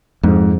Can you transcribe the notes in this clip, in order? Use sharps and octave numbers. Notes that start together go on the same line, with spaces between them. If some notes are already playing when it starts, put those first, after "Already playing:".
F2 G#2